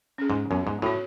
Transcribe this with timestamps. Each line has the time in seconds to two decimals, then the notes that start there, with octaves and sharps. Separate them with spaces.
0.18 C#4 G#4
0.30 G#2
0.51 F#2 B3
0.67 G#2
0.82 A2 F#4 C#5